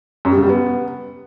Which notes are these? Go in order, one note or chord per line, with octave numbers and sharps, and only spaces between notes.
F#2
G3
C#3
G3
B3